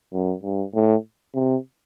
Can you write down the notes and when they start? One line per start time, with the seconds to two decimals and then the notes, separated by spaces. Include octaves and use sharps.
0.13 F#2
0.43 G2
0.74 A2
1.35 C3